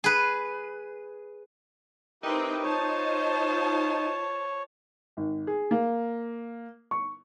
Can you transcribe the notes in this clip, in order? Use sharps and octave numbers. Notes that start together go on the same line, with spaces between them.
G#4 B4
C4 D#4 E4 G4 A#4 B4 G5
F4 C5 C#5 A5
G#1
G#4
A#3
C#6